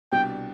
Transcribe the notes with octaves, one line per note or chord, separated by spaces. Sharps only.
C2 B2 G3 D4 G4 G5